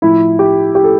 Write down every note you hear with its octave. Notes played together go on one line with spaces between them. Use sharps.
A2 F3 E4
G4
G4
A4